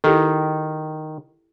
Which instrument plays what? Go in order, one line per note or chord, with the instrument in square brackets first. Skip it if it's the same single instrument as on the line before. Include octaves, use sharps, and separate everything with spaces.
[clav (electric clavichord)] D#3 [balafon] E4 G4 A4